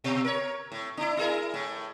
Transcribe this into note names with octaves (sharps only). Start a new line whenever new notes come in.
B2
A#4 C#5
A2
D4 E4
E4 G#4 A#4
A2